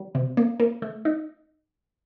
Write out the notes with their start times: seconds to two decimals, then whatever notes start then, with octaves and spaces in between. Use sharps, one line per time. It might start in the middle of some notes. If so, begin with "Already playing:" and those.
Already playing: G3
0.15 C3
0.37 A#3
0.60 A#3
0.82 A3
1.05 D#4